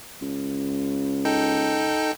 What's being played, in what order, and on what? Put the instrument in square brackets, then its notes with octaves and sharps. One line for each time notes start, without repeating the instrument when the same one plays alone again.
[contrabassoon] C#2
[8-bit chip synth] D#4 A4 G5